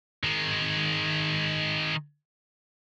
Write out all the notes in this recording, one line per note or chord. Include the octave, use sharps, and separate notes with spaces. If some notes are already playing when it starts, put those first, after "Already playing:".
D#3 G#3